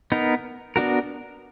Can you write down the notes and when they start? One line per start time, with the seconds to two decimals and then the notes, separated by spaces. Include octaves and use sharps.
0.12 B3 D#4 A#4
0.76 B3 D4 F#4 A#4